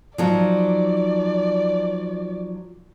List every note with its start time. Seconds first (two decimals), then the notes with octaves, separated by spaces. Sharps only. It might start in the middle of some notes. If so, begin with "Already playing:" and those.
0.18 F3 F#3 D#4 D5